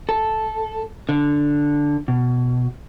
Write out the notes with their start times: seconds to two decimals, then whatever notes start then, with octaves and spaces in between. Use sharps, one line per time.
0.09 A4
1.09 D3
2.08 B2